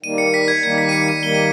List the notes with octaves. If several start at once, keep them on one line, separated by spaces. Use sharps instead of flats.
D#3 G3 A#3 D#7
C#7
B6
G#6
D#3 G3 A#3 G#6
B6
D#7
C#7
D#7
D#3 G3 A#3 G7
D#7